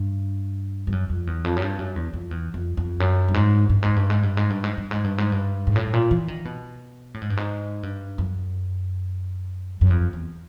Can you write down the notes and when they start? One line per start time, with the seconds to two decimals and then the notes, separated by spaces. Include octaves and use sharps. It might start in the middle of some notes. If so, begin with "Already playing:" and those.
Already playing: G2
0.87 G2
0.92 F#2
1.10 F2
1.27 E2
1.44 F2
1.56 F#2
1.62 G2
1.79 F#2
1.96 E2
2.13 F2
2.31 E2
2.54 F2
2.77 F2
3.00 F#2
3.28 G2
3.34 G#2
3.69 G2
3.82 G#2
3.96 G2
4.10 G#2
4.23 G2
4.37 G#2
4.50 G2
4.64 G#2
4.77 G2
4.91 G#2
5.04 G2
5.18 G#2
5.32 G2
5.67 G#2
5.76 A2
5.93 A#2
6.11 E3
6.28 D#3
6.45 B2
7.14 A2
7.21 G#2
7.30 G2
7.37 G#2
7.83 G2
8.18 F#2
9.81 F#2
9.90 F2
10.13 E2